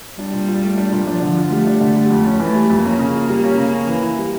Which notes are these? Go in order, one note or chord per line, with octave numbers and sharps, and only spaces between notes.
G3 D4
A#2
F4
A3
D4
A#2
F3 D4
D3
F4
G3 A3
D4
D3
G3
F2
C#4
E3 A3
G3
F2
A#3 C#4
C#3
F4
G3
C#4
C#3
C#4
E3
E4
G3